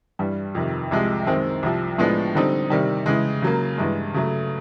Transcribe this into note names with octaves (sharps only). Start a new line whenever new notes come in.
G2 E3 G3
F2 C3 D#3
C2 C3 F3 G#3
F#2 D#3 G#3 C4
C2 C3 F3
A2 F3 G#3 B3 D4
D3 G3 C4 D#4
C3 D#3 G3
C#3 E3 G#3
C#3 F#3 A#3
G2 E3 G#3
C#3 F#3 A3